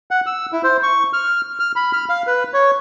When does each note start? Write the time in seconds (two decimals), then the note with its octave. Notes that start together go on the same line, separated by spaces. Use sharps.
0.11 F#5
0.26 E6
0.52 E4
0.64 C5
0.83 C#6
1.13 F6
1.60 F6
1.76 B5
1.93 F6
2.09 F5
2.27 B4
2.54 C#5